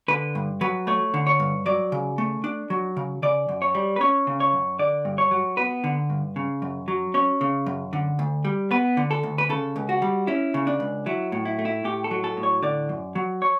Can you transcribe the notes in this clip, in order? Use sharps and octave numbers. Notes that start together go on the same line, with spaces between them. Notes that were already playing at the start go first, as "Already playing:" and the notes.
D3 B4
G2
F#3 B4
A3 C#5
D3
C#5
G2
F#3 D5
C#3
A3
D4
F#3
C#3
C#3 D5
F#2
C#5
G3
B4
C#4 C#5
C#3
C#5
F#2
D3 D5
G2
C#5
F#3
B3 B4
D3
G2
C#3
F#2
F#3
C#4 C#5
C#3
F#2
D3
D2
G3
B3 B4
D3
A4
D2
B4
C#3 A4
C#2
F#4
G3
C#4 E4
C#3
D4
C#2
F#3 E4
A2
E4
A3
E4
A2 G4
A4
F#3
A4
A2
C#5
D3 D5
F#2
F#3
C#5